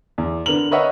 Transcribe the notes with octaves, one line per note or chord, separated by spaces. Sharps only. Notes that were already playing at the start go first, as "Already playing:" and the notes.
E2
D3 B3 A#4 F7 F#7
A#4 B4 C#5 D#5 E5 F#5